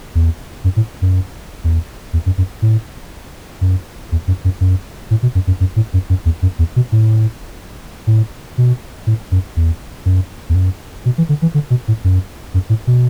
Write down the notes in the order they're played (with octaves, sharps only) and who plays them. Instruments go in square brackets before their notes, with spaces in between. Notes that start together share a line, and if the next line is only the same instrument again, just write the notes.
[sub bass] E2
F#2
A2
F#2
E2
E2
F#2
F#2
A2
F#2
E2
F#2
F#2
F#2
A2
B2
F#2
F#2
F#2
A2
F#2
F#2
E2
F#2
E2
B2
A2
A2
B2
A2
F#2
E2
F#2
E2
F#2
B2
E3
D3
E3
D3
B2
A2
F#2
F#2
A2
B2